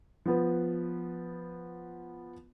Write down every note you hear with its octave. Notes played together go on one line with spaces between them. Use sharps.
F3 B3 B4